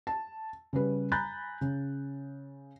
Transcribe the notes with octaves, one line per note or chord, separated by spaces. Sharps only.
A5
C#3 G3 B4
G#5 A#5 B5 F#6 G6 A6
C#3